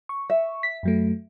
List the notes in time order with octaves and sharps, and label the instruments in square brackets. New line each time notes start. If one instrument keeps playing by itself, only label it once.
[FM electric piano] C#6
[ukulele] E5
[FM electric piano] B6
F#2 F#3 A3